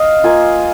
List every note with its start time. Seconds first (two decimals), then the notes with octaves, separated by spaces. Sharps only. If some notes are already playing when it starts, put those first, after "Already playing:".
Already playing: D#5 F5
0.24 A#3 F4 G#5